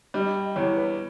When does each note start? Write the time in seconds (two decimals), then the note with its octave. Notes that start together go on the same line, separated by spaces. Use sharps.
0.14 G3 D#5
0.36 D#5
0.56 E2 C#5
0.77 B4